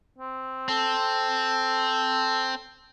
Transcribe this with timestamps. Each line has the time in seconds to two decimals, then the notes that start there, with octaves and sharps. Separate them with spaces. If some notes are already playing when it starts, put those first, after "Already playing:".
0.18 C4
0.68 C4 A4